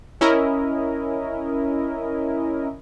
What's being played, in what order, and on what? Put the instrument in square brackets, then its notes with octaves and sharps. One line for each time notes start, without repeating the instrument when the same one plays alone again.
[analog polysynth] C#4 E4 A#4 D#5